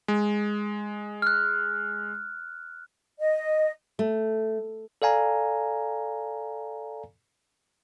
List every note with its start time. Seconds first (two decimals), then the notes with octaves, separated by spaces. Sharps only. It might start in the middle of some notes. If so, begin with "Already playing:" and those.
0.08 G#3
1.22 F6 F#6
3.19 D#5
3.99 A3
5.02 A4 D5 F5 G#5 A#5